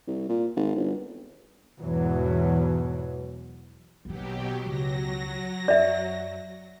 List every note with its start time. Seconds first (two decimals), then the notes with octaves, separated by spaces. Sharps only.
0.07 C2
0.29 A#2
0.56 G#1
0.75 G1
1.80 E2 G#2 B2 E3 F#3
4.05 A#1 B2 D#3 F#3 G4
4.66 C#2 F#3 A#6
5.68 F#2 D5 E5